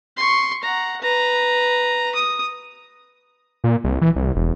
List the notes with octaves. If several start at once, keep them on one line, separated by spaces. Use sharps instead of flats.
C6 C#6
F#5 A#5
B4 A#5
D#6
A#2
C2
E3
C2
E1